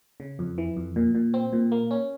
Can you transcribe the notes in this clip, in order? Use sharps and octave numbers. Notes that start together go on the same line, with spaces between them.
C#3
F2
E3
F2
A#2
A#2
C4
A#2
A#3
C#4